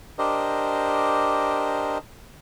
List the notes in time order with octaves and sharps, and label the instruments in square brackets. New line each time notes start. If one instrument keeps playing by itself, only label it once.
[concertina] D4 G4 A#4 C5 D#5